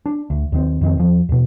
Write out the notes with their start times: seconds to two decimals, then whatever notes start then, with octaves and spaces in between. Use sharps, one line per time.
0.06 D4
0.30 D2
0.52 D#2 D#3 C4
0.81 F2 D#3 B3 C4
0.98 E2 F3
1.29 D#2 B2